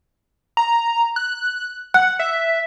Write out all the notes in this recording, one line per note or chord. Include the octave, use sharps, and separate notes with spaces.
A#5
F#6
F#5 F#6
E5